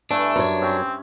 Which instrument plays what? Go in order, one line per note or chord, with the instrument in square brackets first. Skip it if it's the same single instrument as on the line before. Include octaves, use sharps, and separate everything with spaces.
[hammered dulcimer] G2 E4 [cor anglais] A3 [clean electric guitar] D4 [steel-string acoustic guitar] G#5
[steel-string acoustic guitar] F#2 C#5
[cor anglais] C4 [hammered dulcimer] C#4